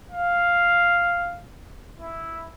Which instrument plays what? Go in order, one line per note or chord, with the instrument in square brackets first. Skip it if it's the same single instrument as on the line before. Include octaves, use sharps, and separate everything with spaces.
[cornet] F5
E4